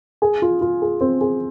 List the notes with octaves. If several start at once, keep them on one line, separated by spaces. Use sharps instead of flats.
G#4
F4
F4
G#4
C4
G#4